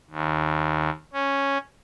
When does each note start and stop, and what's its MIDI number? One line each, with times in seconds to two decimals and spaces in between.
0.10 0.90 39
1.13 1.57 61